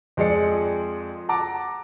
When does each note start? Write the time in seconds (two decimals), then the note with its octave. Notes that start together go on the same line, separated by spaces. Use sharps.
0.17 F2 G#3 D5 C#7
1.29 F#5 A5 A#5 D6